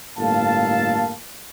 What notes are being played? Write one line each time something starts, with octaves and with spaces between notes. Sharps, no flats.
G1 A2 A#3 A4 F5 A5